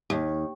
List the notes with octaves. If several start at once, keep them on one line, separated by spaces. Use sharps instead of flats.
D#2